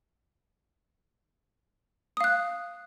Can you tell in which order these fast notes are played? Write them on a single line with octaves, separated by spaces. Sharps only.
D#6 F5 F#6